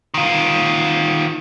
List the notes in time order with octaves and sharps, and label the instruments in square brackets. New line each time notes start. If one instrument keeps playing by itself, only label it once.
[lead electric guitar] D#3 F4